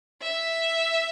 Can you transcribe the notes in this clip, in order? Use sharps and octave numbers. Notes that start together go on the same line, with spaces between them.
E5